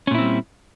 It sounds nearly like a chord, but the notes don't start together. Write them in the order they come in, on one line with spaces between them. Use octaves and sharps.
C#4 A#2 E4 C4 G3